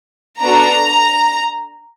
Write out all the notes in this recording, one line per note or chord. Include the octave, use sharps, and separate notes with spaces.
B3 D4 F#4 A4 A#5